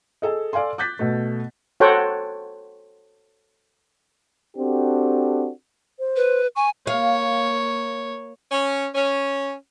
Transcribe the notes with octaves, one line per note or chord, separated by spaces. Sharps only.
G#4 A4 D#5
A4 D5 F5 G#5 C6
D6 F#6 G6 A6 B6
B2 A3
F#4 A4 C5 C#5 F#5 G5
C4 D4 F#4 G4 A4
C5
B4
G#5 C#6
A#3 C#5 F5
C#4
C#4